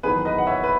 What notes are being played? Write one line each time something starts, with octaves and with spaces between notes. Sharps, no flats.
E2 D#3 F#3 G#4 B4
B4 D#5
F#5
C#5 E5
B4